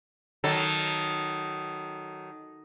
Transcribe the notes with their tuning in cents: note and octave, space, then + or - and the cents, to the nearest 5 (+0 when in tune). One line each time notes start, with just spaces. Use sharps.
D#3 +0 F#3 +15 A4 +0